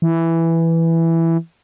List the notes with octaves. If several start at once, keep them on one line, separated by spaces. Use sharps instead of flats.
E3